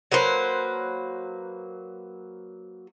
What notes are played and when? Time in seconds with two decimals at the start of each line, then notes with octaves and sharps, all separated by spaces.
0.12 F#3 A#3 B4 C5